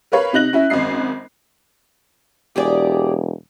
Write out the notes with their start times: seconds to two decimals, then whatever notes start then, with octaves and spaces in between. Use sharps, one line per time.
0.12 A#4 B4 C#5 F5 B5
0.33 C3 D#4 F#6 A#6 F#7
0.53 C#4 E4
0.70 G#1 F#2 D#5 C7
2.56 E1 G4 G#4 D5